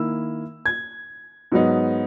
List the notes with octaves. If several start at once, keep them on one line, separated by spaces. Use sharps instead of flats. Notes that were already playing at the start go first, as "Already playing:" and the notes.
Already playing: D#3 A#3 E4 E6
G#6
G#2 F#3 B3 D#4